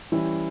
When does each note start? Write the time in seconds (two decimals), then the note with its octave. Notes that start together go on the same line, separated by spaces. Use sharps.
0.12 E3 G3 C#4 E4